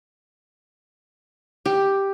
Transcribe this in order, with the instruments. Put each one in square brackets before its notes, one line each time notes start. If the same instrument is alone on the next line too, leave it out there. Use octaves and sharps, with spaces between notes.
[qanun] G4